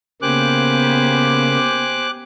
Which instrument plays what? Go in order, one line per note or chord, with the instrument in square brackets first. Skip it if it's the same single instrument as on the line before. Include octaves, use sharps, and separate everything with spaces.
[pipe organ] C#3 A#3 [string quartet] B3 [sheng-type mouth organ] G4 C5 G#5 [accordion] D6 F#6